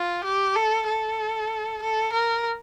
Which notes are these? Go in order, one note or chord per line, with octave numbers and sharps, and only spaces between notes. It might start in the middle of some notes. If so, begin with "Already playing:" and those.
Already playing: F4
G4
A4
A4
A4
A#4